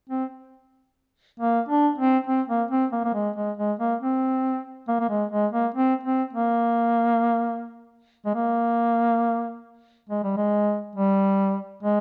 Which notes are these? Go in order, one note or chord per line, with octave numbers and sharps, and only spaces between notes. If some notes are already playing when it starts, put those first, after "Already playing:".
C4
A#3
D4
C4
C4
A#3
C4
A#3
A#3
G#3
G#3
G#3
A#3
C4
A#3
A#3
G#3
G#3
A#3
C4
C4
A#3
G#3
A#3
G#3
G3
G#3
G3
G#3